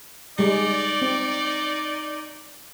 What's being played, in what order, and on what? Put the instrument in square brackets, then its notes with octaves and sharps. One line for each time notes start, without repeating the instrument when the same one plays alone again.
[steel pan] G3 G#3 [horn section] D#4 D5
[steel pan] C4